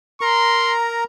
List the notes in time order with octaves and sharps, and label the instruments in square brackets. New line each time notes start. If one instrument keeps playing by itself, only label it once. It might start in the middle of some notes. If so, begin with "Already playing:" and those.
[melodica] A#4 A#5 [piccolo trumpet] C6